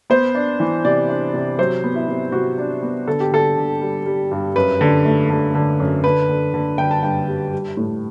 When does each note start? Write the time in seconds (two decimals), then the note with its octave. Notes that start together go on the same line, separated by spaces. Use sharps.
0.10 B3 C5
0.35 D4
0.60 E3
0.85 C3 D5
1.09 D4
1.34 C3
1.59 F#3 C5
1.84 B3
1.95 E4
2.08 C3
2.32 C3 F#4
2.58 D4
2.82 B3
3.08 D3 A4
3.20 G4
3.32 D3 A4
3.57 D3
3.81 G3
4.06 G3
4.31 G2
4.56 F#2 B4
4.81 D3
5.05 A3
5.30 D3
5.55 D3
5.80 F#2
6.04 D3 B4
6.29 D3
6.54 D3
6.78 D3 G5
6.91 A5
7.03 G2 G5
7.28 G3
7.52 G3
7.77 A2